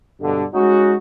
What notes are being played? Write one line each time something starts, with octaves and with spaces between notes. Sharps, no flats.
G2 B2 D3
G#3 C#4 D#4 F#4